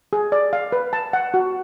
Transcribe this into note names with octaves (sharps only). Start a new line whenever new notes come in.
G#4
D5
F5
B4
A5
F#5
F#4